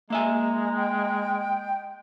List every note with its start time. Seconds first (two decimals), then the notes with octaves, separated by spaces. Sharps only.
0.10 G#3 A#3 E5 G#5 A#5
0.76 G5